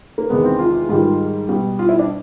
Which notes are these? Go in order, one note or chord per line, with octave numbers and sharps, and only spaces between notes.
A#3
E2 C3 D#3 G#3 B3
C4
F4
G#2 D#3 G3 F4
B2 G3
F4
E4
D4